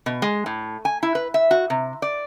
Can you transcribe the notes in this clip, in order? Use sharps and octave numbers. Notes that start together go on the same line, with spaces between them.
B2
G#3
A2
G#5
E4
B4
E5
F#4
C3
D5